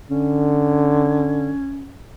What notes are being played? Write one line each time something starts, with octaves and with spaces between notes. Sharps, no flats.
D3 C#4